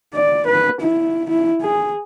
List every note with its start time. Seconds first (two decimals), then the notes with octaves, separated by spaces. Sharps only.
0.14 D5
0.47 B4
0.82 E4
1.30 E4
1.62 G#4